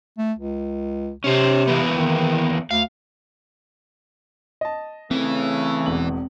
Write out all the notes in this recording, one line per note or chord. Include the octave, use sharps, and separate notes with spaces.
A3
C#2
C3 C#4 C5
E3 A#3 B3
D#3
D2 F5
D#5 A5
C#3 E3 A3 C4
E1 E2 F#7